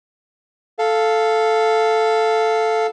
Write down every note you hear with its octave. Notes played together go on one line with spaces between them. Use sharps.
A4 F5